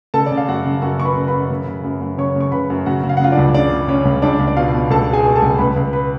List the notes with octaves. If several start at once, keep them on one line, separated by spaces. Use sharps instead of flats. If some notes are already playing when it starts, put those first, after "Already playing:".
C#3 A4 A5
D5
C#3
F5
F#2 F#4 F#5
C#3
F#2 F#4 F#5
C#3 C#6
B4 B5
C#3
B4 B5
F#2
C#3
C#3
F#2
F#2
C#3 C#5 C#6
C#3 C#6
C#3 B4 B5
F#2
C#3 F#4 F#5
C#3
F5
F#5
C#3 F4 F5
D4 D5
C#2
C#3 D4 D5
C#3
C#3 C#4 C#5
C#2
C#2 D4 D5
C#2
D5
B2 F4 F5
B2
C#2 A4 A5
B2 G#4 G#5
B2
A4 A5
C#2
C#2 B4 B5
C#2
B4 B5